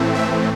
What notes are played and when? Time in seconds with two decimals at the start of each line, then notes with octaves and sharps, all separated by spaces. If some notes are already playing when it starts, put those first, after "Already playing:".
Already playing: A2 E3 A3 C4
0.15 E5